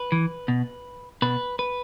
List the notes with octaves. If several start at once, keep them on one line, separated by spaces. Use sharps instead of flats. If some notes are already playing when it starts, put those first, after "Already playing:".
Already playing: B4
E3
B2
B2 B4
B4